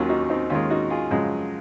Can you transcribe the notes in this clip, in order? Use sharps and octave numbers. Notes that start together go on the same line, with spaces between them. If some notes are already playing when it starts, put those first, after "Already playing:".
Already playing: D#2 D#3 F#3 C#4 F4
D#4 F#4
C4 D#4
D#2 D#3 G#3 C#4 F4
D#4 F#4
F4 G#4
F#2 C#3 F3 G#3